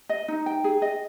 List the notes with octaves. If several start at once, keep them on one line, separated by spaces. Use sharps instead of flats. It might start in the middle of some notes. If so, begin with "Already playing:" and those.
D#5
D#4
G5
G#4
D#5